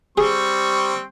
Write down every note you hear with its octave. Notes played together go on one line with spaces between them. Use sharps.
G3 C4 G#4 C#6